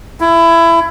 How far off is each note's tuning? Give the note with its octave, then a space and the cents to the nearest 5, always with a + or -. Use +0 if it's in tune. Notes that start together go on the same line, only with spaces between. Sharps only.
E4 +20